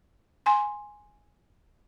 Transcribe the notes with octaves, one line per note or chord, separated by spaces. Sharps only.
G#5 C6